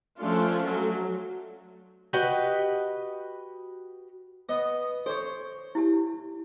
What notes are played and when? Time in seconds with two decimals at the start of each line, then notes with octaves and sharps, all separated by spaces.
0.20 F3 A3 C#4 D4 F4
0.67 F#3 A3
2.13 F#4 G4 B4 D#5
4.49 B3 D#5
5.06 A4 C5 C#5 C#6
5.75 E4 G4 A5